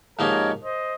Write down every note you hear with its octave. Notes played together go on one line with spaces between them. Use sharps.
G#2 F3 A#3 D#4 G4 A#4 C#5
C5 D#5